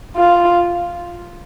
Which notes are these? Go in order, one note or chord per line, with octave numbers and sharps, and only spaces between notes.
F4